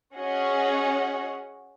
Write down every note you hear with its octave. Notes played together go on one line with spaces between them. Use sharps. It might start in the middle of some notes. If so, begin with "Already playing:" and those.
C#4 F#4 G#4 D#5 F#5